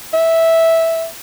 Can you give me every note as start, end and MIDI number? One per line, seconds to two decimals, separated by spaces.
0.13 1.06 76